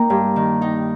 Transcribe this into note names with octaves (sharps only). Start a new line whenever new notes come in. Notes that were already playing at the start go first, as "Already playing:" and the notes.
Already playing: A#3 D#4 G5 A#5
G2
D#3
D#4